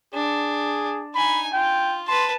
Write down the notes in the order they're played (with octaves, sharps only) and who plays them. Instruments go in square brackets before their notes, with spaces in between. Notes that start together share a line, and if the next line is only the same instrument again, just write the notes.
[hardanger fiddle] D4 [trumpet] G#4
[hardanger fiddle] D#4 G#5 [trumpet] B5
[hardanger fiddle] F4 [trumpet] G5
[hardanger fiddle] B4 A5 [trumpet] C6